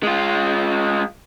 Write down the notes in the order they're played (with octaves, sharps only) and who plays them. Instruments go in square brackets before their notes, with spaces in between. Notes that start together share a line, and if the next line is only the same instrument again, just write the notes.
[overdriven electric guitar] G#3 F4